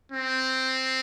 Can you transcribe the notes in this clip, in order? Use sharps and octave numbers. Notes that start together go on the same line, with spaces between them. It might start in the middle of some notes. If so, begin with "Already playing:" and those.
C4